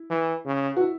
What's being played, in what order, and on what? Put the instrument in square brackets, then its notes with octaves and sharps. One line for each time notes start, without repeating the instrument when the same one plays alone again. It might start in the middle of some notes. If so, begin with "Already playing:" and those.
Already playing: [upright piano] E4
[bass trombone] E3
C#3
[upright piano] F#4
E4